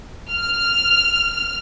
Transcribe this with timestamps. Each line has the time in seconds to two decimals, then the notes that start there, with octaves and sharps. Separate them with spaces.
0.31 F6